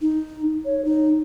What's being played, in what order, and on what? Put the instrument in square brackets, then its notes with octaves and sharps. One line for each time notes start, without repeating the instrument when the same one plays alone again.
[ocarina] D#4
C#5
D#4